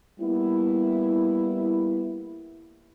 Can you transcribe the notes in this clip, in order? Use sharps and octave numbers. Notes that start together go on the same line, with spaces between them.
G3 A#3 B3 E4